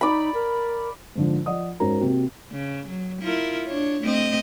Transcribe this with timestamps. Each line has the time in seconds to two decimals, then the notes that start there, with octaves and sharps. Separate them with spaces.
0.01 D#4 D5 B5
0.34 A#4
1.15 G#2 D3 F3
1.46 F3 D5 D#5 F#5 D#6
1.80 G#2 C#4 F#4 A#4 A#5
2.01 C3 A#3 C4 F#4
2.51 C#3
2.87 F#3
3.22 E4 F4 A#4
3.68 D4 C#5
4.02 A3 C4 D#5